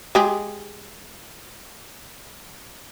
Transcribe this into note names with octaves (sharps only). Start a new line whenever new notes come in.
G#3 G4 G#4